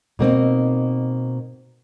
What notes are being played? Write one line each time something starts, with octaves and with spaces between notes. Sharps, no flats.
B2 A#3 C4 D#4